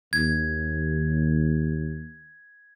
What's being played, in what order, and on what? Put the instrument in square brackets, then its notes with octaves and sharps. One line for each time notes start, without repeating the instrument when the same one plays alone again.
[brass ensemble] D#2 [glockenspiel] G#6